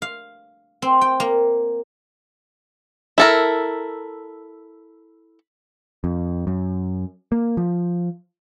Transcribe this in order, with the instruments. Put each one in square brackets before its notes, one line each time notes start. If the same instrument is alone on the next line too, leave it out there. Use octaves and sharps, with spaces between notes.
[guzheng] F5
C4
G5
A#3
[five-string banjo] E4 A4 A#4
[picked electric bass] F2
F#2
A#3
F3